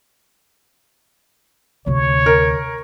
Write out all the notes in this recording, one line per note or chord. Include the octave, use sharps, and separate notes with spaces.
D2 C3 C#5
A#4